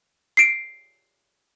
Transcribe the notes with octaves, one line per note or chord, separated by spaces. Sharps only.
C7 D7